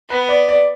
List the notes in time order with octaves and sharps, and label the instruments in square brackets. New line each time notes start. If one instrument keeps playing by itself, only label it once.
[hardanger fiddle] B3 [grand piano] B4
[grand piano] D5
D5